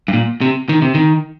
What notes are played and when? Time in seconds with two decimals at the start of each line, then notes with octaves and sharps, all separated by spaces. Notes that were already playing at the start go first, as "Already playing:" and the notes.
0.08 G2
0.13 A#2
0.41 C3
0.69 D#3
0.82 C3
0.95 D#3